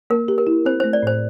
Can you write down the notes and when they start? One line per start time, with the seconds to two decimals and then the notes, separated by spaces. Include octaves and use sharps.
0.10 A#3 A#4
0.28 G4
0.38 A#4
0.47 E4
0.65 C4 C5
0.80 C5
0.84 A3
0.93 D5
1.03 A2 C5